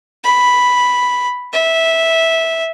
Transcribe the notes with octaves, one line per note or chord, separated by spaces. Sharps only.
B5
E5